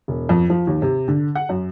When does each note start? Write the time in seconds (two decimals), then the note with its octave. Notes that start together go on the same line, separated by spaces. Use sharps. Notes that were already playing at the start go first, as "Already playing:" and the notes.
0.08 E1
0.29 F2
0.50 F3
0.67 D#2
0.82 C3
1.08 D3
1.35 F#5
1.49 F#2